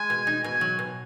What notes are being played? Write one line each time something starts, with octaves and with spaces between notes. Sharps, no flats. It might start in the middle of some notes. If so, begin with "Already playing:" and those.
Already playing: G#3 G#5
B2
D#4
B2 G#5
F#3
B2